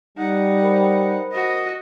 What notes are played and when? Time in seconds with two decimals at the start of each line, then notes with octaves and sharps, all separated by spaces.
0.17 G3 D#4 F#5
0.62 A#4 C5 B5
1.32 F#4 D#5